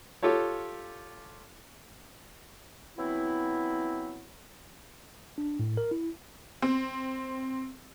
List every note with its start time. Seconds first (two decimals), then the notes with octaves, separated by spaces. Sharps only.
0.23 F4 G4 A4 C#5
2.98 E3 F#3 B3 C4 E4
5.38 D4
5.59 A2
5.77 A#4
5.91 E4
6.62 C4